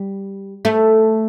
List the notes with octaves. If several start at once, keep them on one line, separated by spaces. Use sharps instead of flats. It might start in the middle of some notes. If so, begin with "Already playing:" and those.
Already playing: G3
A3